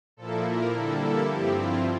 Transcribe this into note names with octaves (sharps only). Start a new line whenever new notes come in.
A#2 F3 A#3 E4 A4
A#4
D3 G3 A#3 E4 A4
A4
G2 F3 C4 E4 G4
F4